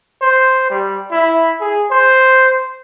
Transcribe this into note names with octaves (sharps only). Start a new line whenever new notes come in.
C5
G3
E4
G#4
C5